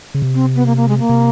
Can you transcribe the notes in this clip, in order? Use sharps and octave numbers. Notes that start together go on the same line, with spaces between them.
C#3
C3
C4
B3
A#3
A#3
G#3
A#3
C3